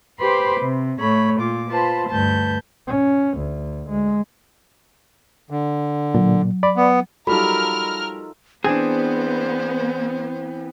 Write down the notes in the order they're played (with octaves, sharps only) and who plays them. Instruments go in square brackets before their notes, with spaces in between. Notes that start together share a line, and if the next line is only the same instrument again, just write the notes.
[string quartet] G4 B4 C5 B5 C6 D6
C3
A2 A3 C#5 B5
A#2 F4 D6
F4 B4 C5 A5 B5
D2 G2 B4 A5 G6
[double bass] C#4
D2
G#3
[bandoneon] D3
[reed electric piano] A#2 [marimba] F#3
[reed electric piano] D5 B5
[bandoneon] B3
[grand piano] F#3 G3 [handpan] D#4 F4 A4 [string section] A#4 F6 [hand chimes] B5
[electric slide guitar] E3 C4 [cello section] B3 [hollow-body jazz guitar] D4 G#4 [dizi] C5